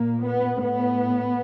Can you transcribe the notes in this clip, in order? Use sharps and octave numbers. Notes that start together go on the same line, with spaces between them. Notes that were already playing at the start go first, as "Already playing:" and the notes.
Already playing: A#2 A#3
B3
A2 B3